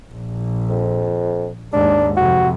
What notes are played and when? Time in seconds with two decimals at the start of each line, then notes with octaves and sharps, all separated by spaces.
0.13 A#1
0.70 F2
1.73 D#2 G#2 D4
2.17 F2 C3 F#4